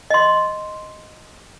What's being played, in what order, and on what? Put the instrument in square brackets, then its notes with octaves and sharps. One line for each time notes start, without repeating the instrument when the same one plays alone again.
[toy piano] D#5 C6